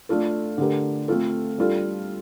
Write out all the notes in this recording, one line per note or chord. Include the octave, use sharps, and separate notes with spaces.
A3 D4 F4 A4
D3 A3 D4 G4 A#4
A3 C4 F4 A4
G3 D4 F4 A4